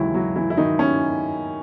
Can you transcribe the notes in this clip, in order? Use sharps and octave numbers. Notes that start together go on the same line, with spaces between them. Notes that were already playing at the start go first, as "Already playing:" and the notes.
Already playing: D#2 C#3 E3 F#3 G#3 E4
F#3 F#4
E3 E4
E4
D#3 D#4
C#4